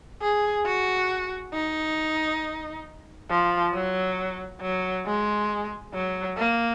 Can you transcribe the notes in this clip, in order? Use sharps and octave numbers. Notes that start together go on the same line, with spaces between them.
G#4
F#4
D#4
F3
F#3
F#3
G#3
F#3
A#3